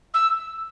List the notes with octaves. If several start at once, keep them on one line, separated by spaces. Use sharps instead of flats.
E6